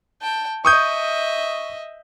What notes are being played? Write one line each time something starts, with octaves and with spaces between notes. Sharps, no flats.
G5 A5
D#5 E5 C#6 D#6 G6